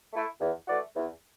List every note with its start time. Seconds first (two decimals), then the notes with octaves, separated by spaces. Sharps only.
0.13 A3 E4
0.40 E2
0.67 E3 A3 F#4 D5
0.96 E2